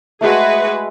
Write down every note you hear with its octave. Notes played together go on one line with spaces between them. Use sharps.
G#3 A3 F#4 G#4 B4